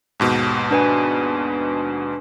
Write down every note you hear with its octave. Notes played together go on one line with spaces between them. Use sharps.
D#2 G#2 B2
D4 B4 G#5